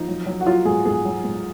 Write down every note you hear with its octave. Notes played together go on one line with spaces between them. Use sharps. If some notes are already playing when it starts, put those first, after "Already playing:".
Already playing: F3 D#4
F#3
F#3
F#4
F#3 F4
G#2 G#4
G#2 G#4
F#3
G#2